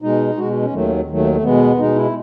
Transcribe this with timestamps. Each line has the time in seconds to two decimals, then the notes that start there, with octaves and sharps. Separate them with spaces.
0.02 B2 G#3 D#4
0.37 B2 G#3 F#4
0.62 C#4
0.73 D#2 D#3 F#3 A3
1.08 D#2 D#3 F#3 A3
1.33 A3
1.43 B2 G#3 B3
1.79 B2 G#3 D#4
1.96 E4